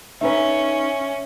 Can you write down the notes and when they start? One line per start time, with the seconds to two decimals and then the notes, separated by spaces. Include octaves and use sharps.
0.21 C#4 D#4 A4 B4 E5